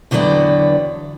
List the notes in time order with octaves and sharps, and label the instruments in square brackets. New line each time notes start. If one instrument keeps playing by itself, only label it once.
[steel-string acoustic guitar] E2 D3 F#3 B3 D5 G5